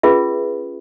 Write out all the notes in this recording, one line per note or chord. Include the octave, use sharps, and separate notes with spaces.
C#4 F4 G#4 B4 E5